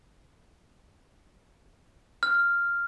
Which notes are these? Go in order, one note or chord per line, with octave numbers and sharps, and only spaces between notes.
F6